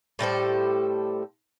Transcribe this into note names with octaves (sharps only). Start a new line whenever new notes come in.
A2 G3 A4 C5